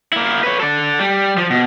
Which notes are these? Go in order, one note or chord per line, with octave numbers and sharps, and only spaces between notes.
A#3 E4
B4 C#5
A4 D5
G3
F3
B2